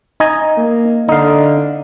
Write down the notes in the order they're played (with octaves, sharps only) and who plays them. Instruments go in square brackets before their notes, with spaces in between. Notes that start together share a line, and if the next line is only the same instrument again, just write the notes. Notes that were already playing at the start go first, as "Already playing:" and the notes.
[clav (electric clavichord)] D#4 D#5 G#5
[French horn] A#3
[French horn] D3 [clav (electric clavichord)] D#4 F5